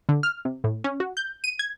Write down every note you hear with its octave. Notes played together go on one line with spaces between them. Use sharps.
D3
F6
C3
A2
C#4
F#4
G6
D#7
G#6